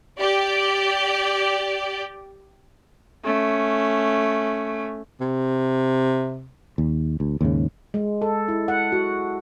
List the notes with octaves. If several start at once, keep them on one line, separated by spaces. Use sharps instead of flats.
G4 D5
A3 C#4
C3
D#2
D2
D#2 G#2 C#3
G#3
A4
E4
F#5
F#4